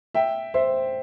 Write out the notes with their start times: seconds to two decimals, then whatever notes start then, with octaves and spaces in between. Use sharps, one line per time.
0.14 E5 G5
0.54 C5 E5